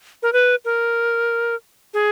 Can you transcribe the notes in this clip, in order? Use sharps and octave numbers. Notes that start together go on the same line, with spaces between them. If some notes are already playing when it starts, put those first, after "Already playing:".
A#4
B4
A#4
G#4